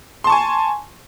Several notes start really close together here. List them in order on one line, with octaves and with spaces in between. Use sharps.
C6 A5 C#6 G#5